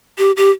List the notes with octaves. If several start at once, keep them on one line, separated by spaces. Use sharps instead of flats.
G4
G4